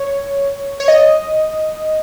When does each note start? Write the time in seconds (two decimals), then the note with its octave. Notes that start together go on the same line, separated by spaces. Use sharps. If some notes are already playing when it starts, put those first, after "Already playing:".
Already playing: C#5
0.80 C#5
0.88 D#5